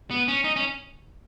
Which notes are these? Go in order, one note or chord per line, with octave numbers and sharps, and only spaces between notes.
B3
C#4
D#4
C#4